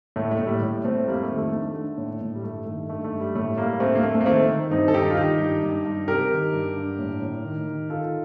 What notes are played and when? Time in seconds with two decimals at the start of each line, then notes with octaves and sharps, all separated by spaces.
0.16 A2 A3
0.31 A3
0.39 A2
0.46 G3
0.61 A2
0.84 A2 A3 C4
1.07 F2 G3 A#3
1.23 A3
1.30 D#3
1.38 A3
1.53 D3 A3
1.76 D3
1.98 A2
2.21 A2
2.35 G3
2.44 G2 A3
2.67 D#3 A3
2.89 D3 A3
3.04 A3
3.12 G2
3.20 G3
3.35 A2 A3
3.57 A2 G3 A#3
3.80 D3 A3 C4
3.95 A#3
4.03 F2 A3
4.14 A3
4.21 A#3
4.26 D#3 A3 C4
4.49 D#3
4.71 G2 C4 D#4
4.88 A4
4.94 D#3 D#4 G4
5.10 F4
5.17 D#3 D#4 G4
5.40 G2
5.63 G2
5.85 G2
6.08 C3 G4 A#4
6.31 D#3
6.53 G2
6.76 D3
6.99 A2
7.22 A2
7.44 D#3
7.67 D#3
7.90 D#3 F4 A4